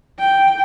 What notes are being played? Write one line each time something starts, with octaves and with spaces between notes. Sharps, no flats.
G5